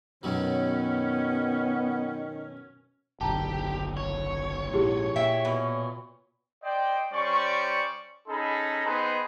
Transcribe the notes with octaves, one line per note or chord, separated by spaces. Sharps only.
F#2 B2 D#3 F#3 B3 C#4
F#1 B1 D3 G4 A5 A#5
C#5
A#1 G#2 E4 G4 G#4
A#2 E5 G5
B2
C5 D5 D#5 G5
G3 C#4 C5 D5 C#6
C#4 D#4 G#4 A4 A#5 B5
B3 C4 D#4 G#4 B4 C5